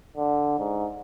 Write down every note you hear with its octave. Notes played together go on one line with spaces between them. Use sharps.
D3
G#2